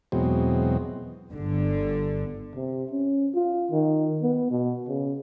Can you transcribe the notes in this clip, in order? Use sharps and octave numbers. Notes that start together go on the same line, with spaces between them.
E2 B2 F#3 G#3 C4
G1 D3
C3
C#4
F4
D#3
B3
B2
C#3